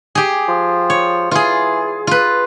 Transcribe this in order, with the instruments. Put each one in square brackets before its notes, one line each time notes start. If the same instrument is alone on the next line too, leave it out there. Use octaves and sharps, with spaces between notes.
[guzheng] G4 G#4
[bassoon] F3
[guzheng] C#5
[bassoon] E3 [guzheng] F4 G#4
[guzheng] F4 B4